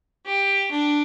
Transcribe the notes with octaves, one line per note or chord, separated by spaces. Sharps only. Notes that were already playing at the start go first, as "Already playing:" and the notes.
G4
D4